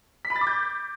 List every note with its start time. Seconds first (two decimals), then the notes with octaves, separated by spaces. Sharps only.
0.25 B6
0.30 B5
0.36 A6
0.41 D6
0.47 G6